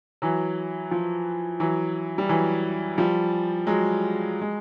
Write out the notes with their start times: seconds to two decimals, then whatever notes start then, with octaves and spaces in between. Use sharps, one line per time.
0.22 E3 F#3
0.91 F3
1.60 E3 F#3
2.18 G3
2.29 E3 F#3
2.98 F3 G3
3.67 F#3 G#3
4.41 G#3